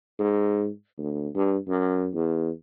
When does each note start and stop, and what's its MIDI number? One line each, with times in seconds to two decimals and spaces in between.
0.19 0.67 44
0.98 1.28 38
1.35 1.57 43
1.68 2.09 42
2.14 2.49 40